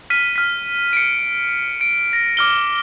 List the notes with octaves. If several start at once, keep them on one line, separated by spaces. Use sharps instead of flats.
F6 B6 D#7
F6 B6
C#7 D7
D7
A#6
D6 F6 G7